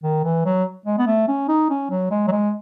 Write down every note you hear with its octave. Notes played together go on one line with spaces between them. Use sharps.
D#3
E3
F#3
G#3
B3
A3
C#4
D#4
C#4
F#3
G#3
F#3
G#3